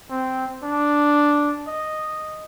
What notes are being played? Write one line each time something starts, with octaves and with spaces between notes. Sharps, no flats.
C4
D4
D#5